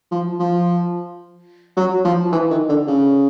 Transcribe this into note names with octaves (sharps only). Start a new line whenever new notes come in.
F3
F3
F#3
F3
E3
D#3
D3
C#3